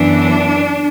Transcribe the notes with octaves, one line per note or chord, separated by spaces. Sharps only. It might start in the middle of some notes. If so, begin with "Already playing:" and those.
Already playing: F#2 E3 B3 D4